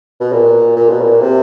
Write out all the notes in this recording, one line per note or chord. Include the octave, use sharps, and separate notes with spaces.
B2
A#2
A#2
B2
A#2
C3